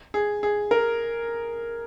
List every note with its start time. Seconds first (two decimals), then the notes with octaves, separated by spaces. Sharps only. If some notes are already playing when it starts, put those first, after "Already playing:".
0.14 G#4
0.43 G#4
0.71 A#4